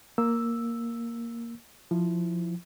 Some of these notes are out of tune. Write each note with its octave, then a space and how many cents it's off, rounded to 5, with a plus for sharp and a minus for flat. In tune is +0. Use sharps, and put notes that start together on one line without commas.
A#3 +0 E6 +0
F3 +0 E4 +0